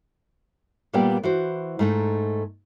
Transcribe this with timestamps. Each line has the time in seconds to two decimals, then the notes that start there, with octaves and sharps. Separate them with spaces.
0.93 A#2 G3 A#3 B3 D5 G5
1.23 E3 F#4 C5
1.79 G#2 A3 D#4